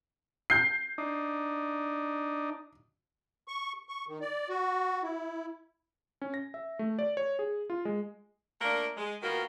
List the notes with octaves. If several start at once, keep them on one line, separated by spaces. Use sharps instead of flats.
G6 C7
D4 D#4
C#6
C#6
D#3
D5
F#4
E4
C#4
A#6
E5
A3
D5
C#5
G#4
F4
G#3
A3 A#3 D4 F4 A#4
G#3
D#3 A#3 B3 F4 F#4 A#4